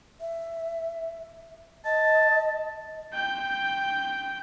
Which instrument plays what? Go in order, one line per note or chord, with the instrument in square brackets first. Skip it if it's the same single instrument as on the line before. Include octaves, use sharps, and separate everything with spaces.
[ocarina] E5
[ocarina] D#5 [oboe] A5
[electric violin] G5 G6